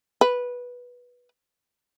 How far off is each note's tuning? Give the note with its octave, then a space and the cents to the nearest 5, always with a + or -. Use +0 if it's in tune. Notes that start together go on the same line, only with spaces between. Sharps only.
B4 -10